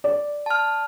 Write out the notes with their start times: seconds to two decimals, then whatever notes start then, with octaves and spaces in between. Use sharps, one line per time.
0.04 D5
0.46 A5 F6